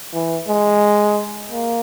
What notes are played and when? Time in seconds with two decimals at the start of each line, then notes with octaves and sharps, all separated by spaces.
0.13 E3
0.48 G#3
1.52 A#3